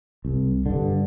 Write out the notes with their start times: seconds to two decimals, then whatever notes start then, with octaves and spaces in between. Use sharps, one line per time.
0.25 C2
0.66 G2 D3